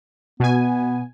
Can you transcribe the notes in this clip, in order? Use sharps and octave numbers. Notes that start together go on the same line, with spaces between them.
B2 B3 G#5